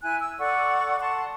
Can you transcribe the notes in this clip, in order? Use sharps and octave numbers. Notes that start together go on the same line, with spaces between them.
E4 G#5 F#6
E6
A4 D5 F#5 C#6
F#5 A5 C6 C#6